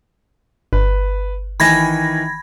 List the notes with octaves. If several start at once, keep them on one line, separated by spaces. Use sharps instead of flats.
G1 B4
D#3 E3 G#5 B5 G#6 A#6